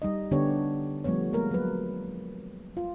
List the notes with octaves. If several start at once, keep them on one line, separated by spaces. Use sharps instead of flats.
G3 D#4 D#5
D3 B3 D4 G4 C#5
F3 G3 A3 B3 C#5
G#3 A#3 B3 A#4
F#3 B4
F4